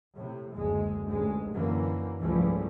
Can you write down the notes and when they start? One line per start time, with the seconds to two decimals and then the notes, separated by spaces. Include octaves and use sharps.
0.14 A2 C3
0.55 F#1 D2 G#3
1.07 A1 D2 G#3
1.50 F#2 A#2 D3 E3 A#3
2.20 C#2 G#2 E3 F3 G3 A3